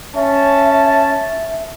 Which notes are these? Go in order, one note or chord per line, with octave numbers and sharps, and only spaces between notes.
C#4 E5 A5